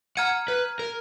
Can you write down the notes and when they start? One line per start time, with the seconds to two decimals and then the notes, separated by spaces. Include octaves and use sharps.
0.17 F#5 A#5 F6 G#6 D#7
0.48 B4
0.79 A#4